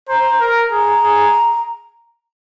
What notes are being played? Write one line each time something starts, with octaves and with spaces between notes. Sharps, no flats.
C5 A#5
A#4
G#4 A#5
G#4